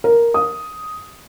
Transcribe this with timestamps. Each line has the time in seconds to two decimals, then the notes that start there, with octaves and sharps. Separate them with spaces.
0.04 A#4
0.34 D#6